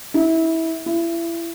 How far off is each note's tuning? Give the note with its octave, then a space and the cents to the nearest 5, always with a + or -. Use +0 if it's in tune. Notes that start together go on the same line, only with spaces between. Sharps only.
E4 -20
E4 +30